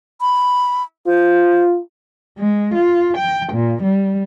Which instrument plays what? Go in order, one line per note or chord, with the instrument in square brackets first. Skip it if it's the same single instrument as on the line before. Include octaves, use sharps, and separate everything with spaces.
[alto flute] B5
[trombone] F4 [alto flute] C5
[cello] G#3
F4
G5
A#2
G3